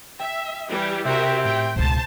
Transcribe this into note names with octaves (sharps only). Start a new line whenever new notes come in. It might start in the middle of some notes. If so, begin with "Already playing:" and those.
E5 G5
E3 G3 G4
C3 C4 E4 F#4 G4 A#4 E5
A2 G5
E1 C#2 C5 A5